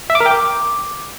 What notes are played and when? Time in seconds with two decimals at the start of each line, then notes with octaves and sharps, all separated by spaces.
0.10 E5
0.15 D6
0.20 A#4
0.26 G5
0.31 D6